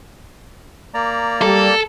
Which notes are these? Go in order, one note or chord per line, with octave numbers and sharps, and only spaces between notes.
A#3 D5 A#5
G3 A4